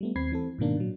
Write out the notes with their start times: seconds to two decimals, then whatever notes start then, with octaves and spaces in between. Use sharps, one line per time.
0.01 G3 A3 B3
0.16 D#2 C4 B5 G#6 C7
0.32 E3 C4 A4
0.58 G#2 B2 D#3 A#3 D4
0.77 A#2 F#3